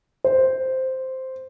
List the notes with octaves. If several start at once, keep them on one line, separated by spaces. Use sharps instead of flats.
C5